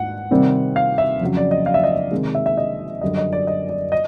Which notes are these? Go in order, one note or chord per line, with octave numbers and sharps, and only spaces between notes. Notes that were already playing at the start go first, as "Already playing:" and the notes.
Already playing: G#2 F#5
C3 D#3 G3 C4
F5
E5
F2 C#3 F#3
D5
D#5
F5
E5
D#5
E5
C3 D#3 G#3
E5
E5
D#5
F#2 D3 G3 D#5
D#5
D5
D#5
D5
D#5